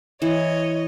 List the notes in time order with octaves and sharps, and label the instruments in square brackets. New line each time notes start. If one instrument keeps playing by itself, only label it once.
[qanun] E3 [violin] C#5 D#5